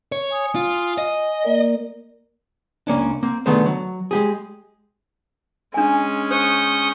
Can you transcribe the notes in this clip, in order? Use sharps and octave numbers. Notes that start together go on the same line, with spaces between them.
C#5
G#5 D#6
F4
D#5
A#3 A#4 D5
C#2 A#3 C#4 D4
A#3 C4
D3 D#3 A3 B3 G#4 C5
F#3
G#3 G4 G#4
G#3 C#4 D4 G#5
C5 C#6 D#6 G6